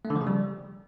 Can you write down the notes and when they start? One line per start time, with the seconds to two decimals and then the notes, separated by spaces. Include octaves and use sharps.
0.05 A3
0.10 D3
0.16 F3
0.21 C#3
0.27 G3